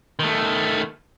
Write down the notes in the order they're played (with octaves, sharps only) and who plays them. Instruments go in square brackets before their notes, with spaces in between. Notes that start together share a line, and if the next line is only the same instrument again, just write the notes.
[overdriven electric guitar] D#3 A3